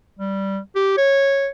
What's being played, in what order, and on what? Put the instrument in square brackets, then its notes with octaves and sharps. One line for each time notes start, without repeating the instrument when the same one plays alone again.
[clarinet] G3
G4
C#5